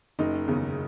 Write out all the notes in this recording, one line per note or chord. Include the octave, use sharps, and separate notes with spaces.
F#1 D#4
E2 C#3